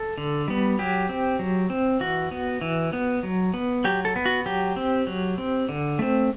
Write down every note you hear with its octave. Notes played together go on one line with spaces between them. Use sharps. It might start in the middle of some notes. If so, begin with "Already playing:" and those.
Already playing: A4
D3
G3 B3
F#3 G4
C4
F#3
C4
E3 F#4
B3
E3
B3
F#3
B3
F#3 G4
A4
B3
F#4
F#3 G4
C4
F#3
C4
D3
A3 C4